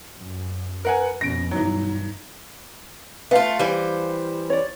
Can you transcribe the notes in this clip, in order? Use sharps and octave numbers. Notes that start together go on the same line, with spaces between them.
F#2
A#4 B4 F#5 G#5
F2 B2 C#4 A#6 D7
G2 E3 F#3 D#4
A3 F4 B4 F5
E3 G3 C5
C#5 D5